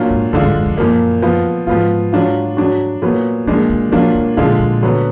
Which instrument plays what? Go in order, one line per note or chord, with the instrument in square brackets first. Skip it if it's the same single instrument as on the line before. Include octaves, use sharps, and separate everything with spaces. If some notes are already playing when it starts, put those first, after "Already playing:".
Already playing: [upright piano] A#2 F#3 D4 F4
[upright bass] G#2
[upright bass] F#2 [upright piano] D3 G#3 D4 F4
[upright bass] G#2
F#2
F2
[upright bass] F#2 [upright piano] A#2 F3 A#3
[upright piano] F3 B3 F4
[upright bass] G#2 [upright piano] F3 B3 F4
[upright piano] F#3 D4 F4
F#3 D4 F#4
A#2 F#3 B3
[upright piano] A#2 G#3 D4 [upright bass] F3
[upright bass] D#3
[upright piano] A#2 F#3 A#3 D4 F4 [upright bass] F3
[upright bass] D#3
[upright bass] A#2 [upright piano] D3 F3 G#3 D4 F4
[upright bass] A#2
[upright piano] D3 F#3 B3